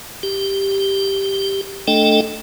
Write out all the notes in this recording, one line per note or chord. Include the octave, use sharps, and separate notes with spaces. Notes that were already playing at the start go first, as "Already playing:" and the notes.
G4
A3 D4 A4 D#5 G5